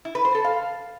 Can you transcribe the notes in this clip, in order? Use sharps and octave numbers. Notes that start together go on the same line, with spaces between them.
E4
B4
C5
A4
F5